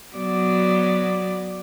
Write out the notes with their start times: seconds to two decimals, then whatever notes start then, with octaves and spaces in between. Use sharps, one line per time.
0.14 F#3 B3 D5